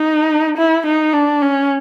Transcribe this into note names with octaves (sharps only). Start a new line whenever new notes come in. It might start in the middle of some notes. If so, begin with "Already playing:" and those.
Already playing: D#4
E4
D#4
D4
C#4